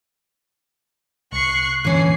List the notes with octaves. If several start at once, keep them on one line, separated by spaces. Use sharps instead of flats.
C2 C#6 F#6 C7
A#2 D3 E3 C#4 C7